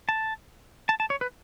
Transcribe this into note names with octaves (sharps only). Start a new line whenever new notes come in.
A5
A5
A5
C#5
B4